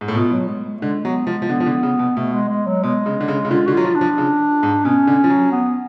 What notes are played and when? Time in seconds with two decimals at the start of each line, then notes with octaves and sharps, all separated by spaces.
0.01 G#2
0.08 A2
0.15 B2 F4
0.32 F#3
0.48 G#3
0.66 G#3
0.78 A3
0.82 D3 G#3
1.04 F#3 B3
1.27 F3 G#3
1.42 F3
1.49 D3 B3
1.60 F3
1.66 D3
1.83 C#3
1.99 B2
2.17 B2 A3
2.33 G#3
2.49 G#3
2.67 F#3
2.83 B2 G#3
3.06 C#3
3.21 D3
3.28 C#3
3.45 C#3
3.51 D3 F4
3.67 D3 F#4
3.73 F#3 F4
3.84 F3
3.95 D4
4.01 F3
4.18 C#3
4.63 G#2
4.85 B2 C#4
5.07 D3
5.24 F3
5.30 F#3
5.52 B3